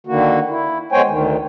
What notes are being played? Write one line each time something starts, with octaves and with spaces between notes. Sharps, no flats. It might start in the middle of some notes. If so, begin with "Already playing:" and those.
D3 D#3 A#3 F#4
E4
G#3 B3 C5 C#5 G5 G#5
D2 D#3